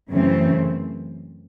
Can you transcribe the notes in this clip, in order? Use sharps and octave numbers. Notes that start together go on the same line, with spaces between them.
F#2 C#3 E3 A3 C4